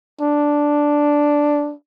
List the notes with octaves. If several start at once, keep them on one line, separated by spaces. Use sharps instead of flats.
D4